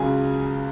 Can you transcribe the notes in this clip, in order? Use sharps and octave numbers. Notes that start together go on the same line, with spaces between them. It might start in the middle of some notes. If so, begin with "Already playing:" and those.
Already playing: C#2 C#3 F#3 G#5